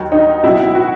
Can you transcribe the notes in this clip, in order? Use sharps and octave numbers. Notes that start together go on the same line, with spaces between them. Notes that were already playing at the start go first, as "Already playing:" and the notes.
Already playing: D#2 D#3 F#3
D#4
C#2 B2 F#3 E4
F#4